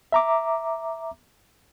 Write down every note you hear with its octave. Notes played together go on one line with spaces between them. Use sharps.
E5 A#5 D6